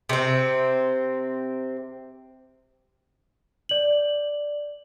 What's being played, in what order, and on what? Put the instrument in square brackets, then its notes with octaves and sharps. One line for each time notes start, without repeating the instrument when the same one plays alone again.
[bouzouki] C3 C4
[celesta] D5 F#7